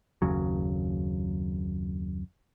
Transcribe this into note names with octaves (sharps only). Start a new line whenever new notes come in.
F#1 D#2 C#3 F#3